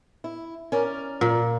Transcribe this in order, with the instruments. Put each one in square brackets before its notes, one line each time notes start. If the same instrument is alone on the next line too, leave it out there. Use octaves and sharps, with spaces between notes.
[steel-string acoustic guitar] E4
C#4 A#4 D5
[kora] A#2